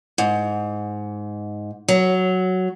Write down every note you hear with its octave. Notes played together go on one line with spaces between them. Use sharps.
G#2
F#3